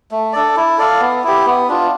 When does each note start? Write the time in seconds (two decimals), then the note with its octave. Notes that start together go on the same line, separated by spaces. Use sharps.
0.11 A3
0.33 D4 A4 D5
0.57 E4
0.78 A4 D5 F5
1.00 B3
1.24 E4 G4
1.46 B3
1.69 D4 F4